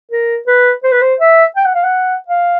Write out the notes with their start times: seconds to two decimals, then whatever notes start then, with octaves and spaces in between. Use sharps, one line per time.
0.12 A#4
0.47 B4
0.84 C5
0.92 B4
1.02 C5
1.19 E5
1.56 G5
1.65 F#5
1.74 F5
1.83 F#5
2.28 F5